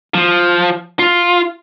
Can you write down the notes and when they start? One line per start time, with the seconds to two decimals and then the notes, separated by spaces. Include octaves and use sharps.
0.14 F3
0.99 F4